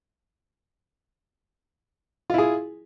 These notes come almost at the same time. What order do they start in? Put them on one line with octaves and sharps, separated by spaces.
F4 E4 G#4